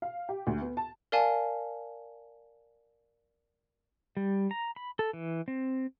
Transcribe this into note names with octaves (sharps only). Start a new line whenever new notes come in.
F5
G4
D2
B3
A5
A#4 D5 F5 G#5 A5
G3
A#5
B5
A4
E3
C4